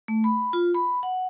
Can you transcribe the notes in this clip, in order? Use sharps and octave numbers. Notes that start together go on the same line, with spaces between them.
A3
B5
F4
B5
F#5